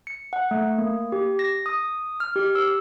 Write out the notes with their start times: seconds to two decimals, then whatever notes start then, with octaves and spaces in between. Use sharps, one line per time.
0.07 C#7
0.33 F#5
0.51 A3
0.78 A#3
1.12 G4
1.39 A#6
1.66 D#6
2.20 F6
2.36 G4
2.55 E6